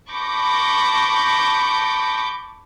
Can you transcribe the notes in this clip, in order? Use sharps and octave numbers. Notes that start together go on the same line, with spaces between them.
A5 B5 C#6 D6 G6 A#6